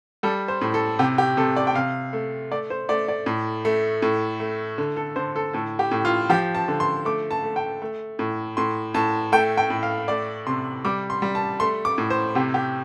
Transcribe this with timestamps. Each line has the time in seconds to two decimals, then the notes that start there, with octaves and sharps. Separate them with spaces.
0.23 G3 A4
0.48 C5
0.61 A2
0.74 A4
0.99 C3 G4
1.18 G4
1.37 C3 A4
1.56 D5
1.67 G5
1.75 C3 F5
2.13 A3
2.51 A3 D5
2.70 C5
2.89 A3 D5
3.08 D5
3.26 A2
3.65 A3
4.02 A2
4.40 A3
4.78 D3
4.97 A4
5.16 D3 C5
5.36 A4
5.53 A2 A4
5.79 G4
5.91 A2
6.05 F4
6.30 F3 G4
6.55 A5
6.68 D3
6.80 C6
7.05 A3 D6
7.31 A5
7.43 A3
7.56 G5
7.82 A3
8.19 A2
8.57 A2 C6
8.94 A2 A5
9.32 A3 G5
9.57 G5
9.70 A2
9.83 F5
10.08 A3 D5
10.46 C3 C6
10.85 G3 D6
11.10 C6
11.22 G3
11.35 A5
11.60 A3 C6
11.85 D6
11.98 A2
12.10 C5
12.35 C3 G4
12.54 G4